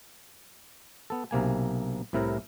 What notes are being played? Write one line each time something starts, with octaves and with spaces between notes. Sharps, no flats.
B3 A4
B1 C3 A#3 G#5
C2 A2 C3 E4 A#4